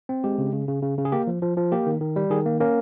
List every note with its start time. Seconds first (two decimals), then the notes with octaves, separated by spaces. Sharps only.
0.09 C4
0.24 G#3 G4
0.38 C#3
0.53 C#3
0.68 C#3
0.83 C#3
0.98 C#3
1.05 G#4
1.12 A#3 G4
1.27 F3
1.42 F3
1.57 F3
1.72 A#3 G4
1.87 D#3
2.01 D#3
2.16 G3
2.30 D#3 G#4
2.46 A#3
2.60 A#3 C#4 A#4